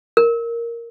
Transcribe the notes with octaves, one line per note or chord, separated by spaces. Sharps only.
A#4